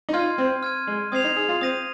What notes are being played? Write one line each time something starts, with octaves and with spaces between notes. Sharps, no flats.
D#4
F4 C6 F6 G#6 D#7
C4
F6 G#6 D#7
G#3
C4 D#6 G#6 C7 F7
D#4
G#4
F4
C4 D#6 A#6 D#7